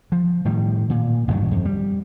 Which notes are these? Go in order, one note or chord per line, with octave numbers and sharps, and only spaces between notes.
F3
A2 D#3 G3
A#2
A1 G2 D#3 F#3
F2
G3